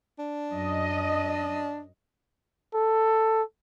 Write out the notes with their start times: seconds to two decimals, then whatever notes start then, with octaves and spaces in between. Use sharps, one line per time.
0.19 D4
0.52 F#2 D#5
2.74 A4